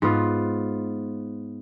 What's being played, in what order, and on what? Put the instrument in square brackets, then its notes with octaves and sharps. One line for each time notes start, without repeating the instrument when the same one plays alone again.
[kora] G#2 B3 F4